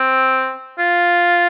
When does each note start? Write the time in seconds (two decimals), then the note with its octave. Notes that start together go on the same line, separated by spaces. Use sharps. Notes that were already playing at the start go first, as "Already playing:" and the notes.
Already playing: C4
0.79 F4